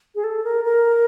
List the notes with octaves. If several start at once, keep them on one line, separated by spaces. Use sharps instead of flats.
G#4
A4
A#4
A#4